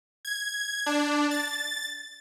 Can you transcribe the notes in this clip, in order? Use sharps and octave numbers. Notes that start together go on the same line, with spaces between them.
G#6
D4
A6